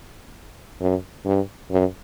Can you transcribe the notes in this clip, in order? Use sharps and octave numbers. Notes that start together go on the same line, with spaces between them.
F#2
G2
F#2